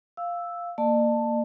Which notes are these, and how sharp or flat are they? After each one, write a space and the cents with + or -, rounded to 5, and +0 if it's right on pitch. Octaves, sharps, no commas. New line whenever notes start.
F5 +0 E6 +0
A#3 -10 D5 +45 A5 +5